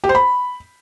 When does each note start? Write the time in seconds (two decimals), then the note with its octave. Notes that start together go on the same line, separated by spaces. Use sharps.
0.04 G4
0.09 C5
0.15 B5